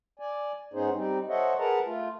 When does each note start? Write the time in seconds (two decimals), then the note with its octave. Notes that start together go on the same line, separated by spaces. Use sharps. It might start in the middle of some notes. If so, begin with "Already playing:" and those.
0.19 D5 G#5
0.73 G#2 B3 C#4 D#4 G#4 C5
0.94 G3 C4 D#4
1.29 A4 C5 C#5 D#5 E5 F#5
1.59 G#4 A#4 B4 F#5 A5 A#5
1.86 A3 F4